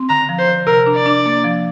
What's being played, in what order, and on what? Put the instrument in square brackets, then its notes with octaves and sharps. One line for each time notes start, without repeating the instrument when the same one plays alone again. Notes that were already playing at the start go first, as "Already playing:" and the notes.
Already playing: [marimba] C4
[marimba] D3 [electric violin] A#5
[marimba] F3
[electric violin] C5
[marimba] D3
[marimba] C3 [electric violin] A#4
[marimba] D4
[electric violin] D5
[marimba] D4
A#3
F3